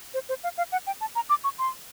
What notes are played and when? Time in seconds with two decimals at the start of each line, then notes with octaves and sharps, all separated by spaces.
0.14 C5
0.29 C5
0.44 F5
0.58 F5
0.72 F#5
0.87 G5
1.01 A5
1.15 A#5
1.30 D6
1.44 C#6
1.59 C6